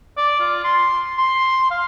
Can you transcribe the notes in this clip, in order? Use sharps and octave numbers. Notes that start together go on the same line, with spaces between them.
D5
F4
C6
C6
F5